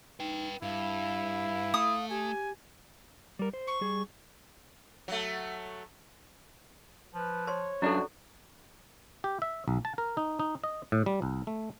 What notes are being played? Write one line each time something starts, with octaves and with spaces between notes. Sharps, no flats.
D#4 B4 G5
G2 E4 F5
A3 D#6
G4 G#5
G3 A#4
C5
C#6
G3 G#4
F#3 A3
F3 B4
C5 C#5 C6
F#2 D4 E4 F#4 A4
G4
E5
B1
A5
A#4
D#4
D#4
D#5
A2
G3
C2
A3